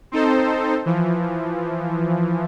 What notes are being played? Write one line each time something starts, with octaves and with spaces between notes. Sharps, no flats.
C4 D#4 A4 C5
E3 F3